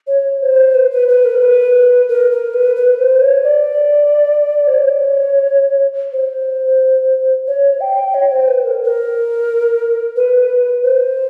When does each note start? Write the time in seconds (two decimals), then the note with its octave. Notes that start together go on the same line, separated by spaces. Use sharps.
0.07 C#5
0.41 C5
0.75 B4
0.91 B4
1.08 B4
1.25 A#4
1.41 B4
2.09 A#4
2.31 A#4
2.54 B4
2.76 B4
2.99 C5
3.21 C#5
3.43 D5
4.67 C5
4.78 C#5
6.12 C5
7.47 C#5
7.81 G5
8.14 C#5
8.31 C5
8.48 B4
8.64 A#4
8.84 A#4
10.16 B4
10.83 C5